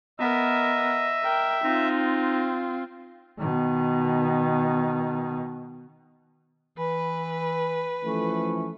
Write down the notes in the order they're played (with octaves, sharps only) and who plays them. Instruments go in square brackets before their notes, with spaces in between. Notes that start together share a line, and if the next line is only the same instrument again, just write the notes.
[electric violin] B3 A#4 [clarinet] D#5 [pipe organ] E5
[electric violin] A#4 G5
[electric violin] C4 F4 [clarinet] D#4
[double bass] B2 D#3
[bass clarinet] E3 [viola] B4
[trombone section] E3 F3 A3 [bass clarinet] C#4